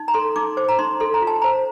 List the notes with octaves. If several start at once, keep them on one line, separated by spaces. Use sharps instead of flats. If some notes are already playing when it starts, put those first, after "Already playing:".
Already playing: D#4
A#5
A4 C6
D#4 D6
C5 D6
A#5
D#4 C6
A4 C6
A#5
F4
A5
C5 A#5